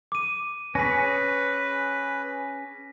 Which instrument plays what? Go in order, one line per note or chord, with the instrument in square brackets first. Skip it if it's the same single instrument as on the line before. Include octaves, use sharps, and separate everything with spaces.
[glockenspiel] D6 D#7
[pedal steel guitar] C#4 G#4 [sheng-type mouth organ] B4 [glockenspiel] A#6 B6